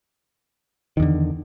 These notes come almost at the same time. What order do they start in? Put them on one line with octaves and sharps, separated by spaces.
D#3 E2 D3